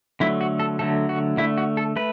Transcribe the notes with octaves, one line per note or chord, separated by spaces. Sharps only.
D3 F#3 A3 E4
F#4
A4
D3 F#3 A3 A4
F#4
D3 A3 E4
F#4
A4
A3 B4